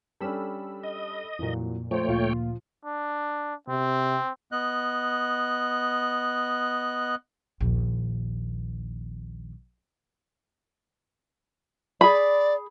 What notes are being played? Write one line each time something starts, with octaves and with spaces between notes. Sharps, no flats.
G3 C#4 D4 A4 B5 E6
D#5
F2 A#2 E3 F#3
F3 A3 C5 C#5 G5
D2 A#2 F4
D4
C3 C4
B3 D#5 F#6
A#1 D#2
G#4 D5 B5